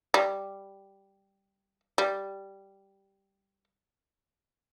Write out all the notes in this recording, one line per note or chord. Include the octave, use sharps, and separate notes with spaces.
G3
G3